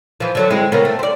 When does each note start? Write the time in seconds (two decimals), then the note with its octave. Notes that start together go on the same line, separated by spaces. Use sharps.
0.20 E3 F3
0.35 D3 F#3 A3
0.50 G#3 C4 E4
0.72 C#3 A#3 B3
0.85 A3
0.99 C5 D5